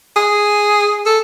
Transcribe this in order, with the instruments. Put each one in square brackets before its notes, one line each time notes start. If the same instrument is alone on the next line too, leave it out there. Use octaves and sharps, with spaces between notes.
[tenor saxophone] G#4
A4